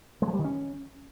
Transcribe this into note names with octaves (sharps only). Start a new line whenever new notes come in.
G#3
F3
G3
D#3
C#4